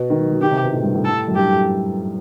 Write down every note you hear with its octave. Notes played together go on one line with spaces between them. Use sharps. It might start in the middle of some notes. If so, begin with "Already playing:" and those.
Already playing: B2
D#3
F#3
F#3
D#3 G4
C3
B2
A2
G2
A2
A4
F#2
G2 G4